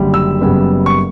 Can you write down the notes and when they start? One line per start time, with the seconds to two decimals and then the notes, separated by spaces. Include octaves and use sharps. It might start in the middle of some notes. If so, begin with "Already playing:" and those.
Already playing: F#1 F#2 D3 G3
0.14 E6
0.41 F#1 F#2 C#3 G3 B3
0.86 C#6